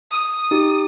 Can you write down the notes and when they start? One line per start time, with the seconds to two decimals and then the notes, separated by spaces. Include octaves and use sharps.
0.11 D#6
0.51 D#4 G4